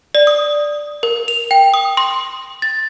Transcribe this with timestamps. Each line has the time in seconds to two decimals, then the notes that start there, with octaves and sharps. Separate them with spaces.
0.15 D5
0.27 D#6
1.03 A#4
1.28 F7
1.51 G5
1.74 D#6
1.97 C6
2.62 A6